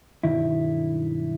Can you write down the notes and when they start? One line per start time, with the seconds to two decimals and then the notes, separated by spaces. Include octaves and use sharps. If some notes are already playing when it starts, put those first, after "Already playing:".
0.23 B1 G2 D#3 E4